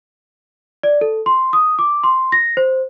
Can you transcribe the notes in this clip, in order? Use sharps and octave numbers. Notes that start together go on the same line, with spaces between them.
D5
A4
C6
D#6
D6
C6
A#6
C5